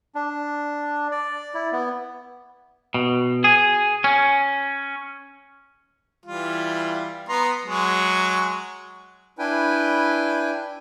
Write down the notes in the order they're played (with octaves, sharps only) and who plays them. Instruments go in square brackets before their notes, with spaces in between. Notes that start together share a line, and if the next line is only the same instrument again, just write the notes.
[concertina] D4
D5
E4
B3
[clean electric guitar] B2
G#4
C#4
[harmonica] E3 G3 F4
B3 A#5 C6
F#3 G#3
[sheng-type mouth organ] D4 E4 B4 G5 G#5